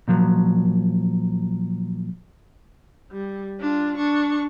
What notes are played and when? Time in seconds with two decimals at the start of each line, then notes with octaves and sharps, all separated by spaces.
0.08 A#2 F3 F#3
3.13 G3
3.60 D4 F4
3.98 D4 C#6